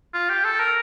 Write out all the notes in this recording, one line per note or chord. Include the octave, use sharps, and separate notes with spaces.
F4
G4
A4
A#4